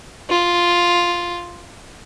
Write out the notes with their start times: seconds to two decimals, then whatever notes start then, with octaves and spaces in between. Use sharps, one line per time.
0.30 F4